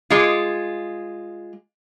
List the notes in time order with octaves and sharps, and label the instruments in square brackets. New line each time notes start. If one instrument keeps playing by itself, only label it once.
[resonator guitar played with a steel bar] G#3 F4